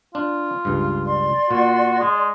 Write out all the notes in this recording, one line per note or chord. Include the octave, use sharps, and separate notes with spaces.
D4 F4
C#2 G2
D5 C6
A#2 F#4
G#3